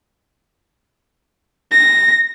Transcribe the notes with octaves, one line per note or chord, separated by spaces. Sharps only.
A#6